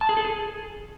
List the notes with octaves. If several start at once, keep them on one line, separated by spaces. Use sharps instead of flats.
A5
G#4
A4
G#4